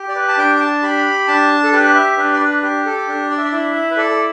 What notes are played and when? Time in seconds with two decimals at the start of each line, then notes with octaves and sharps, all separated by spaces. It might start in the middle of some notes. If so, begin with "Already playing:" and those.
Already playing: G4
0.09 D5
0.15 B4
0.28 A5
0.38 D4 G5
0.55 G5
0.60 A5
0.83 G4 B5
1.27 D4 A5
1.64 A4
1.73 G4 B4
1.95 E5
2.17 D4 B4
2.34 D5
2.40 B4
2.63 G4
2.86 A4
3.08 D4
3.30 D5
3.38 E5
3.44 D5
3.52 E4 E5
3.75 E5
3.91 B4
3.97 A4 D5
4.11 A4